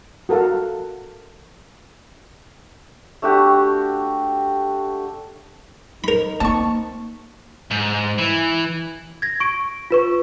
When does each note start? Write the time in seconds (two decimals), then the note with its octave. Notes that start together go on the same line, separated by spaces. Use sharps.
0.29 F#4 A4 A#4 F5
3.22 A3 D4 F#4 G4
6.04 D#4 A#4 B5
6.40 A#3 C4 A5 C#6
7.71 G#2
8.18 E3
9.22 G#6 A#6
9.40 C#6 D7
9.90 F4 B4 C#6